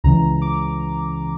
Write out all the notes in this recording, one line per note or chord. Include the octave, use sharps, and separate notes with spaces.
C#2 C#3 E3 A#5
D6